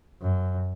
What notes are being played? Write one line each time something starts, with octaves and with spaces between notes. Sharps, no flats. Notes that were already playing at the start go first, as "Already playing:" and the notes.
F#2